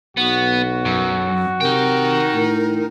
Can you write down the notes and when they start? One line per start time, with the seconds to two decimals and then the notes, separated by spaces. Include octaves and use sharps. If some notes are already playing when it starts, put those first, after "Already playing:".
0.17 B1 B3 F#4
0.85 F#2
1.61 C3 D#4 A#4 G5
2.34 A2